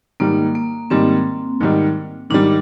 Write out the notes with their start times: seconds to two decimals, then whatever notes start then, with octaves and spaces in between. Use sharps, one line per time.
0.20 G#2 D#3 G3 A#3
0.55 A#3
0.90 G#2 D#3 G3 C4
1.61 G#2 D#3 G3
2.30 G#2 D#3 G3 D4